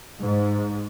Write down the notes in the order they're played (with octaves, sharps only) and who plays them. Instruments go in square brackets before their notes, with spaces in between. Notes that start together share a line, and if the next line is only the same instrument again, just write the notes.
[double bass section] G#2